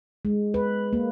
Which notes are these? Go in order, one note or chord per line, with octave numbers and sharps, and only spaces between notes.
G#3
B4
A#3